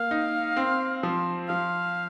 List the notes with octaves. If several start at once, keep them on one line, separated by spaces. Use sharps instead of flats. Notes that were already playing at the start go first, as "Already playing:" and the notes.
Already playing: A#3 F5
D#4
C4
F3
F3 F5